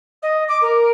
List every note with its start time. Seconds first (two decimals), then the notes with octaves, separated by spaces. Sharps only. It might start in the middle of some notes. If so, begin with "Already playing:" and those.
0.22 D#5
0.48 D6
0.61 A#4